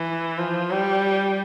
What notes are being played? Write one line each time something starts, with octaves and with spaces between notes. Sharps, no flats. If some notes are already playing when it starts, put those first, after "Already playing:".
Already playing: E3
F3
G3